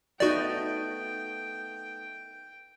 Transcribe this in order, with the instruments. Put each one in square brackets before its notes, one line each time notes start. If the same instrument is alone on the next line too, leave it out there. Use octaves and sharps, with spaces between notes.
[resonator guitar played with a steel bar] A3 B3 D#4 [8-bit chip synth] F#4 D5 [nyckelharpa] G5